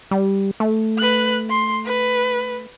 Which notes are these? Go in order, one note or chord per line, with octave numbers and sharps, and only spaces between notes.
G3
A3
B4 F#6
C6
B4